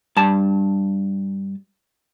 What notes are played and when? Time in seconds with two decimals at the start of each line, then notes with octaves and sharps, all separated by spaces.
0.17 G2 A5